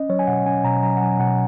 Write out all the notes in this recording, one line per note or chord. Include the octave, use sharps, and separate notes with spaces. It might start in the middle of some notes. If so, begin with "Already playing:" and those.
Already playing: C#4 D#5
F#3 C#5
G#5
B2 F#5
C#4 G#5
B2 A#5
F#3 A#5
F#5
F#3 G#5
B2 F#5